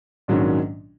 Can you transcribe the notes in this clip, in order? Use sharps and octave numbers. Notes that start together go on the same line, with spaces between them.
A#1 G#2 D#3 F#3 C#4